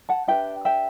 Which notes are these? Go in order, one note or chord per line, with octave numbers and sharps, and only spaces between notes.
F#5 A5
D4 G4 B4 E5 G5
E5 G5